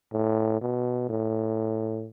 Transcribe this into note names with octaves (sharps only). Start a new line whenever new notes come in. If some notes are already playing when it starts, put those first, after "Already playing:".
A2
B2
A2